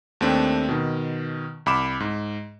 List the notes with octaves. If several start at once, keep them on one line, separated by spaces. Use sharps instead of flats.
D#2 A3 C4 D4
B2 D#3
C2 B5 D6 E7
G#2